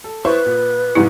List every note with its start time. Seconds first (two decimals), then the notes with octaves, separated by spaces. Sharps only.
0.04 A4
0.25 E4 B4 C5 C#6
0.46 A#2
0.95 F1 G#2 G3 E4